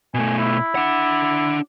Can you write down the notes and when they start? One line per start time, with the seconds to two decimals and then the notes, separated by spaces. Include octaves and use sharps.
0.14 B2 A3 G#5
0.39 E4
0.75 D4 F#5